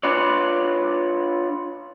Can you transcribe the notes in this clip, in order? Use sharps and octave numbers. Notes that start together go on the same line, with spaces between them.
D4 F4 B4 C#5 D5